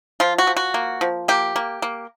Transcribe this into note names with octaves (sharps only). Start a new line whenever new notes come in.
F3 F4
F#4
F3
F#4
A#3
F3
A#3 G4
A#3
A#3